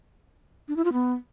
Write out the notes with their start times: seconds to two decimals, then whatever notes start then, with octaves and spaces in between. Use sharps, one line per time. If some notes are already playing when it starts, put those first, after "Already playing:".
0.68 D4
0.76 E4
0.85 F4
0.93 B3